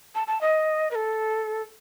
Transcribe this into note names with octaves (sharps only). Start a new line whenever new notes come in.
A5
A5
D#5
B4
A4